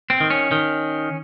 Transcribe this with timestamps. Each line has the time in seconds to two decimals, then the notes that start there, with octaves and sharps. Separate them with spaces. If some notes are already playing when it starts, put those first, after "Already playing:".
0.10 C4
0.20 D#3
0.30 C#4
0.51 D#3